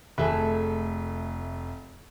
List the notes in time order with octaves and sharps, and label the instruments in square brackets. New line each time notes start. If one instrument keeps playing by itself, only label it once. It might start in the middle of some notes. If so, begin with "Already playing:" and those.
[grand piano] F1 E5 F#6 [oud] A3 G#4 A4